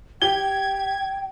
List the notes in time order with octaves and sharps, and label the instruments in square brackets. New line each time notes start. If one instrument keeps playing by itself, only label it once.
[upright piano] G4 G7 [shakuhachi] G5 [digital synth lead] G#6